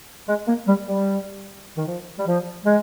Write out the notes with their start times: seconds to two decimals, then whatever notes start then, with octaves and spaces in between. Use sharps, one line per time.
0.28 G#3
0.47 A#3
0.67 G3
0.88 G3
1.77 D#3
1.86 F3
2.19 G3
2.26 F3
2.65 G#3